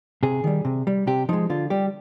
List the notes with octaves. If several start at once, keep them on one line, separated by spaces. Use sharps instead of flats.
C3 G#4
D#3 G3
C3
G3
C3 G4
F3 G#3 D#4
D3 F4
G3 G4